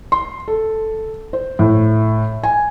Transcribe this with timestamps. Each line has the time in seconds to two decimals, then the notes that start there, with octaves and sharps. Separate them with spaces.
0.12 C6
0.48 A4
1.33 C5
1.59 A2
2.43 G#5